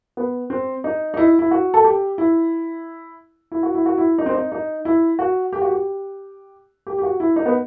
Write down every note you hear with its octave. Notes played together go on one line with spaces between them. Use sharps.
B3
C4
D#4
D#4
E4
E4
F#4
A4
G4
E4
E4
F#4
E4
F#4
E4
D#4
C4
D#4
D#4
E4
F#4
G4
F#4
G4
G4
G4
F#4
E4
D#4
B3